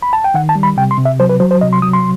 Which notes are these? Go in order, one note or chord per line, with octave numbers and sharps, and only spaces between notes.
B5
A5
G5
D#3 F#5
A5
G3
B5
C3 G5
C6
C3
E5
F#3 C5
B4
F#3 C5
C5
C3 D#5
C6
F#3 D#6
C6